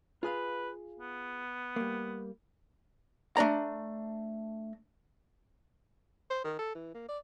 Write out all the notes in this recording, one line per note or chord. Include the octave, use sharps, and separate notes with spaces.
F4 G#4 B4 F5
B3
G3 A#3
A3 D4 D5 A#5
C5
D#3
A4
E3
A#3
D5